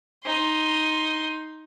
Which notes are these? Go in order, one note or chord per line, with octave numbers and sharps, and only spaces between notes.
D#4 C6